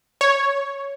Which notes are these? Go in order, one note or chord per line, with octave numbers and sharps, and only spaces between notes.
C#5